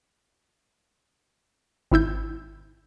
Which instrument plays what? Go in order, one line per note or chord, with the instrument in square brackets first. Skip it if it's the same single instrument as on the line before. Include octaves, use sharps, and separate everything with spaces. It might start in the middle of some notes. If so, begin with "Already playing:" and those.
[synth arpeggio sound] G#1 E4 E6 G6